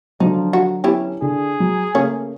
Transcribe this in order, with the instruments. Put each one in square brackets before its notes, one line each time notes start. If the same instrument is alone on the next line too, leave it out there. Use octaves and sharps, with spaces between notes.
[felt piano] D3 F#3 [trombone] F3 [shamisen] D#4
[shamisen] F#4
[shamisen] B3 E4 G4 [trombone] C#4
[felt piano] D3 [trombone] G#4
[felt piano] F#3
[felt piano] C#3 [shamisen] A3 A#3 C#4